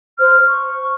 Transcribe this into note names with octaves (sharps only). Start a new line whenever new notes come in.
C5 F6
C#6